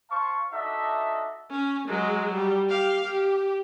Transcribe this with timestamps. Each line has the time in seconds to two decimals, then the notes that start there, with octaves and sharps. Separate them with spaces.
0.11 C5 F5 A5 C6 C#6
0.52 D4 D#4 F#4 A4 D#5 E5
1.50 C#4
1.88 F#3 G#3
2.34 G3
2.69 G4 F5
3.04 G4